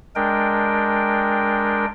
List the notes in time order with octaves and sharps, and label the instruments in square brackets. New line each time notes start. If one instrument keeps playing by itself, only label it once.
[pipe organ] G#3 D4 A#4 G5